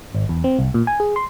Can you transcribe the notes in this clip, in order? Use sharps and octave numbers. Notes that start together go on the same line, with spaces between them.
G#1
E2
C4
C2
A#2
G#5
G#4
C6